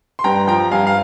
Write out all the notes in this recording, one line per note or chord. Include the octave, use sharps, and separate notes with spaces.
C6
G2 G5 A#5
F3 G5 A#5
G2 F5 G#5
F5